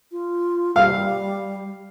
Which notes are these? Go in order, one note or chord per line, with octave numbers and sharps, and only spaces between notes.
F4
G3 F5